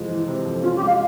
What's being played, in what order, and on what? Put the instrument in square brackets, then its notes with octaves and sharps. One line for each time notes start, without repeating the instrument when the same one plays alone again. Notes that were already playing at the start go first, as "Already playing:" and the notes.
Already playing: [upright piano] F2 C3 E3 G#3
E3
C3
F2
[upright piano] C#4 [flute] F4
[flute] G4
[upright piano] G#3
[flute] F5